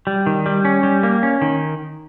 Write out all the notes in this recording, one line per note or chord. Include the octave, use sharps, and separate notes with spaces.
G3
D#3
G3
C#4
G3
A#3
C#4
D#3